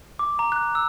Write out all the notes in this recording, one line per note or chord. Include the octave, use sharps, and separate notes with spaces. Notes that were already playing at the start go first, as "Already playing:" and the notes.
D6
A#5
F#6
E6